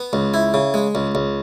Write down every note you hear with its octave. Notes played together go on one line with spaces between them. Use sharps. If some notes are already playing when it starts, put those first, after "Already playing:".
Already playing: B3
C#2
E4
C#3
G#3
C#2
C#2